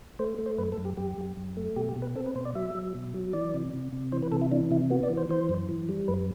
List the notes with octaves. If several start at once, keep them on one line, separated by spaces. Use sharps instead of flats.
A3 C5
A3
C5
F#2 B4
A4
F#2
G4
F#2 G4
F#2
F#2
A3
B2 G4
G4
B2
B4
C4 A4
B4
B2 C5
D5
F#3 E5
F#3
B2
F#3
E3 D5
C3
C3
C3
E3 C5
B4
C3 A4
E4
E3 D4
C3 E4
B3 F#4
D5
E3
C5
E3 C5
F#2
E3
G3
F#2 B4